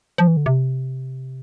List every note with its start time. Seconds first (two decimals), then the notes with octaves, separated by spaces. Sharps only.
0.18 F3
0.27 E3
0.37 D3
0.46 C3